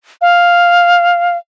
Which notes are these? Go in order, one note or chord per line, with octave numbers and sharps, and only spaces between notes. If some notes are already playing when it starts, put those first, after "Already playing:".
F5